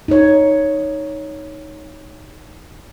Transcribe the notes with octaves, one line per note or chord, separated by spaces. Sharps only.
D#4 C#5